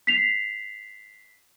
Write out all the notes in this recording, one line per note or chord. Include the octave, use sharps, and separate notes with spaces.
B6 C7 F7